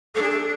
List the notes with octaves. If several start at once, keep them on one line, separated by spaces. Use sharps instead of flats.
D4 A4
G#4
A4